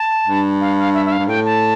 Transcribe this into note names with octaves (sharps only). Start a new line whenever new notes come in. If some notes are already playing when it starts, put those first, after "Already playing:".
Already playing: A5
G2
F5
F5
E5
E5
F5
G2
A2 G5
A5